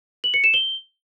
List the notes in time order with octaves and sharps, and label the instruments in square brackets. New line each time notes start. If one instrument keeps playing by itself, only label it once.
[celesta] F#7
C#7
E7
G7